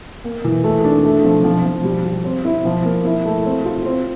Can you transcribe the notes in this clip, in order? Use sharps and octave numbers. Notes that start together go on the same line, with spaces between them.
A#3
E3
A3
D4
A3
F3
F3
F3
G3
G3
C4
E4
F3
A#3
E4
A3
C4
F4
C4